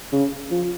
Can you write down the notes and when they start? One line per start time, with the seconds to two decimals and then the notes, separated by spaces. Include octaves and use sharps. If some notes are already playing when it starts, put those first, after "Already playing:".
0.13 C#3
0.51 F3